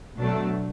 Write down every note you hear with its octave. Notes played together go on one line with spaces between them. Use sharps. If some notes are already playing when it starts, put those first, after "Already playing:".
B2 F#3 A3 D4